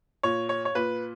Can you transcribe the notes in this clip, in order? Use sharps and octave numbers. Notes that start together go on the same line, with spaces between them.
A#2 C#5
C#5
C#5
A#2 B4